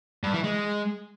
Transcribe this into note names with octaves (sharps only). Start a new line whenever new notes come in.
G2
E3
G#3